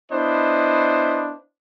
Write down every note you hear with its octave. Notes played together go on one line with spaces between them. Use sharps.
B3 D4 E4 C5 D#5